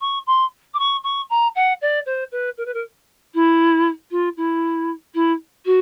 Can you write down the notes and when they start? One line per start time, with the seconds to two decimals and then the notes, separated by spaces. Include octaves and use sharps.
0.01 C#6
0.26 C6
0.73 D6
0.79 C#6
1.03 C#6
1.29 A#5
1.55 F#5
1.81 D5
2.06 C5
2.31 B4
2.57 A#4
2.65 B4
2.74 A#4
3.34 E4
4.11 F4
4.37 E4
5.14 E4
5.65 F#4